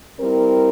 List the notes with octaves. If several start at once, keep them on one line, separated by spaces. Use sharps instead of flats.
G3 C4 E4 A#4